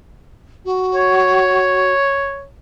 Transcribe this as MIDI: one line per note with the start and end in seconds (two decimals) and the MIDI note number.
0.65 1.92 66
0.95 2.45 73